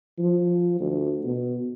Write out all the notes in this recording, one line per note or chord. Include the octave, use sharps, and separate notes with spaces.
F3
D2
B2